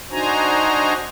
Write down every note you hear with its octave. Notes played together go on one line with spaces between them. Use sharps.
D4 D#4 F#4 C5 G#5 A#5